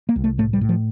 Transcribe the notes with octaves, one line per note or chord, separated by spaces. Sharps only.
A#3
C2
A3
A2 A3
G3
A2
F3